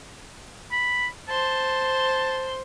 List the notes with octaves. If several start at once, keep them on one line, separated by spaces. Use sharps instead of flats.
B5
C5 A5 C6